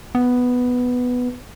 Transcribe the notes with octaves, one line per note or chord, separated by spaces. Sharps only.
B3